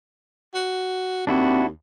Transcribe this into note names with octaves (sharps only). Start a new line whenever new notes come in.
F#4
D#2 C4 D4 E4 F#4